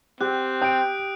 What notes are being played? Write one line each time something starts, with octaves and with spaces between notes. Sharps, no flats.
C4 G4 F#6
G5 D#6 D7